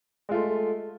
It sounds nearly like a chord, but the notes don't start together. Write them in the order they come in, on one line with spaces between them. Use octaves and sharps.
G#3 F4 A3